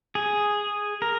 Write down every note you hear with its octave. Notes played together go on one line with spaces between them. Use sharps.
G#4
A#4